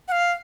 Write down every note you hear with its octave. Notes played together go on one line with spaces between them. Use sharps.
F#5
F5